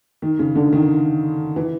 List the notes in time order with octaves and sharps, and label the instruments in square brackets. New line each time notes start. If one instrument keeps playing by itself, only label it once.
[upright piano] D#3
C#3
D3
D#3
E3